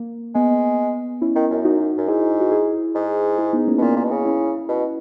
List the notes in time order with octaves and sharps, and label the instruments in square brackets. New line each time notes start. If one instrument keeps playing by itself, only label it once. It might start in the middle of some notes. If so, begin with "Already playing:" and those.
Already playing: [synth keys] A#3
[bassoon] G#3 [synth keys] B3
[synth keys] C#4 E4
[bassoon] D#3
F#2
[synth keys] D#4 F#4
[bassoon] F#2
[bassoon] G#2 [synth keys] E4 G#4
[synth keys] F#4
E4 G#4
[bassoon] G#2
[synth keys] E4 G#4
B3 D#4
A#3 C#4
[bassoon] B2
[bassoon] A#2 [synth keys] B3 D#4
[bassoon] A#2
B2
C#3
[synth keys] C#4 E4
[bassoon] B2